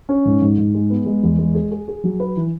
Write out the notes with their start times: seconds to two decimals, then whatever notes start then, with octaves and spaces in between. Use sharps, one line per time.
0.09 C#4
0.25 G#2
0.42 G#2
0.58 G#2
0.74 G#3
0.90 B3
1.06 G#3
1.23 E2
1.39 G#3
1.55 G#4
1.71 G#4
1.88 G#4
2.04 F#3
2.20 B4
2.36 E3